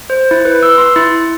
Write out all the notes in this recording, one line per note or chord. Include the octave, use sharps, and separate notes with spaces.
C5
E4
B4
E6
C6
E4